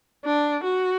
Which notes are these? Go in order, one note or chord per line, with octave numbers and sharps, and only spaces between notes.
D4
F#4